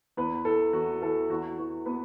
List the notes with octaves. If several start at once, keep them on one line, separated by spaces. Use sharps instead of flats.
E2 B3 B4
E3 A4
E2 F#4
E3 A4
E2 F#4
E3 F#4
B3 B4